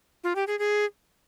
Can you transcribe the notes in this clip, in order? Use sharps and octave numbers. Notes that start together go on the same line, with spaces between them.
F4
G4
G#4
G#4